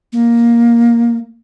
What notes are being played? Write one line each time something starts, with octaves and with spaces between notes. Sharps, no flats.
A#3